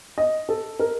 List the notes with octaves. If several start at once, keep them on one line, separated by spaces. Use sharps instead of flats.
D#5
A4
A#4